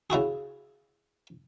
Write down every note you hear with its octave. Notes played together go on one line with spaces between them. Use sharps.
C#3 E4 F#4 G#4